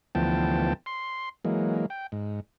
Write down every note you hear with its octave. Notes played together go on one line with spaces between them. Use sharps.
D2 E3 F3 B3 G5 A5
C6
E3 F#3 G#3 A#3
G5
G#2